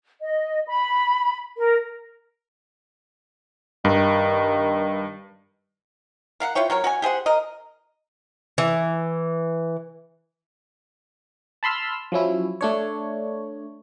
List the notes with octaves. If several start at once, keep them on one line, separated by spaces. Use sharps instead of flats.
D#5
B5
A#4
G2 D#3
A#4 F5 F#5
E4 F4 C#5 G5
F#3 A#4 C#5
F#4 C#5 G#5
G4 G#4 C5 F#5
A#4 D#5
E3
A5 B5 C6 E6 F6
F3 F#3 C#4 E4
A3 D4 C#5